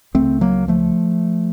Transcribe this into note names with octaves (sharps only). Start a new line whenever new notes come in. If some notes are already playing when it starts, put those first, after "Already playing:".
C#2 C#3 A3 C4
F#3 A#3
F3 A3